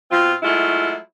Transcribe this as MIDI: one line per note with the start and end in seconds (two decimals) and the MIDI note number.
0.11 0.33 47
0.11 0.33 60
0.11 0.33 65
0.43 0.95 54
0.43 0.95 56
0.43 0.95 57
0.43 0.95 64
0.43 0.95 65